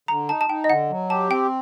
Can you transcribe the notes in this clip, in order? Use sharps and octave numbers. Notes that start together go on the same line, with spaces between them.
D3 A#5
D#4 A5
A5
D#4 G5
D#5
D3 F#5
F#3
G4 A5
C4 G5